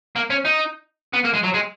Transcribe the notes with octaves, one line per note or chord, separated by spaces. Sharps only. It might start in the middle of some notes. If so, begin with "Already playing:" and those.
A#3
C#4
D#4
B3
A#3
G#3
F#3
G#3